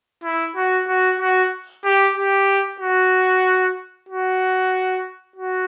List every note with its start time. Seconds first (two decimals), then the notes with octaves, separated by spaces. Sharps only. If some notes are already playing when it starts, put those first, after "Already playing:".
0.24 E4
0.56 F#4
0.88 F#4
1.20 F#4
1.84 G4
2.16 G4
2.80 F#4
4.09 F#4
5.36 F#4